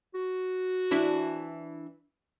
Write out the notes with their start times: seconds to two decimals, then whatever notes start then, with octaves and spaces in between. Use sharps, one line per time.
0.14 F#4
0.91 E3 D4 E4